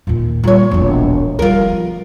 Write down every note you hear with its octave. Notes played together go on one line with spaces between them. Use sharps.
D#2 A#2
A#2 G3 F4 C#5
E1 A#1
F3 G3 F4 A#4